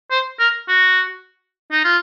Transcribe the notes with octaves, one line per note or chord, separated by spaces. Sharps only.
C5
A#4
F#4
D#4
F4